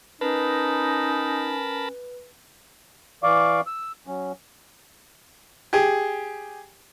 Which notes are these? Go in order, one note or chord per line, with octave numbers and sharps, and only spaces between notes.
C#4 D#4 A#4 B4 A5 B5
E3 D5 F5 C#6 D6
E6
F#3 C#4
G4 G#4